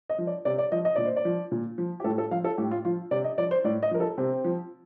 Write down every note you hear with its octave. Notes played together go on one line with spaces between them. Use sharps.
D#5
F3
D5
C3 D5
D5
F3 D#5
D#5
A#2 D5
C5
D5
F3
A#2
F3
G4
A2 A4
A4
F3 F5
A4
A2 G4
F4
F3 F4
C3 D5
D#5
F3 D5
C5
A2 D5
D#5
F3 A#4
A4
C3 C4
F3